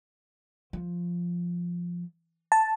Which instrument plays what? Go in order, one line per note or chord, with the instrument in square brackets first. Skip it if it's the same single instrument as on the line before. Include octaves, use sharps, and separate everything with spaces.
[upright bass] F3
[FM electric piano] A5